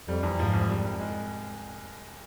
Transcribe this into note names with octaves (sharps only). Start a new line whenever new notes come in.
F2 G3
E2
G#2 F3
C2
G3
C2
G#3